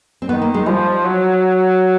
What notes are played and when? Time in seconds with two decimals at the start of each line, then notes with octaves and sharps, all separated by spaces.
0.22 C4
0.29 D#3 B3
0.42 A#3
0.54 G#3
0.66 F3 G3
1.04 F#3